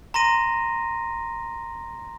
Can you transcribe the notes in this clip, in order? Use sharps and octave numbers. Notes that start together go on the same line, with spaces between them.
A#5 C6 A#6 D#7